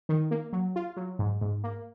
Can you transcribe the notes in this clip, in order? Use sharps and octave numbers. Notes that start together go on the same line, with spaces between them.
D#3
A#3
F#3
F4
F#3
G#2
G#2
A#3